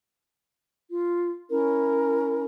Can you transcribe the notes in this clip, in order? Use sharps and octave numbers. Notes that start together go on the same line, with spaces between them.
F4
C#4 E4 A#4